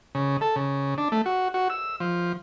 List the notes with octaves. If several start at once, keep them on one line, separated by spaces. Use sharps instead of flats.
C#3
A4
C#3
D4
A3
F#4
F#4
E6
F3